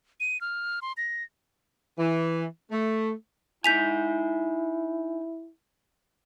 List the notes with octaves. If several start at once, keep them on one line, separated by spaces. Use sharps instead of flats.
D#7
F6
C6
A#6
E3
A3
D#4 E4 G#5 G6 B6 F7